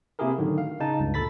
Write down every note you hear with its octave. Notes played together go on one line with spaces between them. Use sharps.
C3 A#3 E4 G4 G#4 A#4
A2 D3 D#3 F#3
F5
C#3 D#4 A5
C#2 G2
D2 A#2 A4 B5 A6 B6